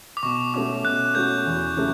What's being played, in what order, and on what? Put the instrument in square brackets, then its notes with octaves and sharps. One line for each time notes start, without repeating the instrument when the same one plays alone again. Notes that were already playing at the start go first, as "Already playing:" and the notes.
[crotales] D6
[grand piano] B2 [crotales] C#6
[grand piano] A3 C#4 F#4 [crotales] D6
[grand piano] B2 [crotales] F#6
[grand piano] A3 C#4 F#4 [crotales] G6
[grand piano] E2
C#3 F#3 A3